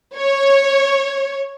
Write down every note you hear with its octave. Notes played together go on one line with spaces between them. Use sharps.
C#5